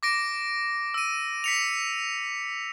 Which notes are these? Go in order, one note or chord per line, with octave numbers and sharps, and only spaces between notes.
D6 A#6 D7
E6 D#7
B6 C#7 F7